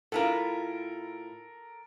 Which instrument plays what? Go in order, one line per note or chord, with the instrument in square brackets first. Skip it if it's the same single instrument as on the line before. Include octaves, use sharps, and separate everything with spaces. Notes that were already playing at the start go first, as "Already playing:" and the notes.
[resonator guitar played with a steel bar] A2 E4 F4 [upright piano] A4 A#4